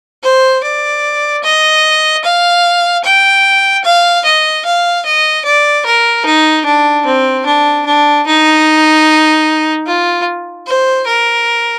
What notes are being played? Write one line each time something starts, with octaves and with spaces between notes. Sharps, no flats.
C5
D5
D#5
F5
G5
F5
D#5
F5
D#5
D5
A#4
D#4
D4
C4
D4
D4
D#4
F4
C5
A#4